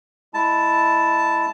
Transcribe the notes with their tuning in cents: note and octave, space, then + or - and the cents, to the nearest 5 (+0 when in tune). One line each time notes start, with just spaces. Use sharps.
G#3 -10 E4 +0 A5 +0